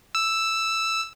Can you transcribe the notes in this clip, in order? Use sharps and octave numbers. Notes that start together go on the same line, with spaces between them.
E6